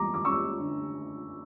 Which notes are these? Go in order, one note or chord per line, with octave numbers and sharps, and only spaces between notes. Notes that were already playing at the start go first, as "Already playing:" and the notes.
Already playing: E2 G3 A#5 D6
D6
C#4 C#6 E6
D3